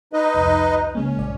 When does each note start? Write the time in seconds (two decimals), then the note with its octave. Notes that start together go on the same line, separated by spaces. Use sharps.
0.13 D#4 B4 D#5
0.34 C2 F2
0.95 C#3 G#3 A#3 C#4
1.16 A#1 G2 D5